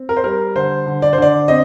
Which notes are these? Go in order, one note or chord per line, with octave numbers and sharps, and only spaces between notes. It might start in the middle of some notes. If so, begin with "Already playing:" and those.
Already playing: C4
A#4
C5
G3 A#4
D3 C5
D3
D5
C5
D3 D5
C4 D#5